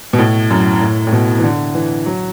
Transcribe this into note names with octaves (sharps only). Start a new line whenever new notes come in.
B2
A2
F#2
A2
A2
B2
E3
D3
E3
F#3